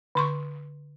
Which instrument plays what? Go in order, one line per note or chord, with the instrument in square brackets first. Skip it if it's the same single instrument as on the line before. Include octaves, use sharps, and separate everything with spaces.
[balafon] D3 C6 C#6